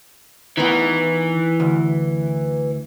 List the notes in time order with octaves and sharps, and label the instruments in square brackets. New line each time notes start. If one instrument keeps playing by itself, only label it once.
[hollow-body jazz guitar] D#3 B3 [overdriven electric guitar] E3
[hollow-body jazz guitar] D2